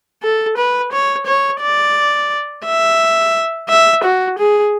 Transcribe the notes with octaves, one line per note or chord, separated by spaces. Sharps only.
A4
B4
C#5
C#5
D5
E5
E5
F#4
G#4